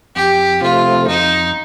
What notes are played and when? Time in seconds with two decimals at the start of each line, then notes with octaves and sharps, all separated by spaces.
0.16 F2 G4
0.61 C3 F3 A3 F4
1.07 F2 D#4